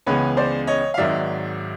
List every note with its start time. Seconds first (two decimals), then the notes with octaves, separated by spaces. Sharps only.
0.06 C#2 C#3 E3 G#3 B3 B4 C#5
0.37 C5 D5
0.67 C#5 D#5
0.94 F5
0.97 G#1 G#2 D#3 F#3 D5 E5